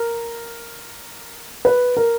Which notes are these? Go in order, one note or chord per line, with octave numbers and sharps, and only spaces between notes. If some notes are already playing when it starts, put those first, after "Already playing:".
Already playing: A#4
B4
A#4